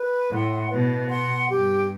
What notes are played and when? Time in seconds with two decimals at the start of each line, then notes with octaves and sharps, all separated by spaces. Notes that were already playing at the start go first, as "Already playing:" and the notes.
Already playing: B4
0.32 A2 F#5 C6
0.70 B2 B4
1.09 F#5 C6
1.49 G2 G4